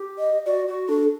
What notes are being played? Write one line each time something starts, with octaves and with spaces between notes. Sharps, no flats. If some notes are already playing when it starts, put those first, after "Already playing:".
Already playing: G4
D#5
F#4 D5
F#4
D4 A4